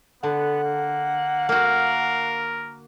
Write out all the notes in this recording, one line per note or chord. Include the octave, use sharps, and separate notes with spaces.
D3 B3 F#5
A#3
A#3 F#4 A#4 F5